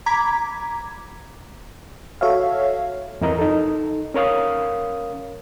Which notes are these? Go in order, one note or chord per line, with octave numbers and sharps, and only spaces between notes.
A#5 B5 D6 G#6 B6
F#4 A4 C#5 E5 F5
F2 E3 A#4 D#5 A#5
D#4 A4
C#4 A#4 C#5 F5 D#6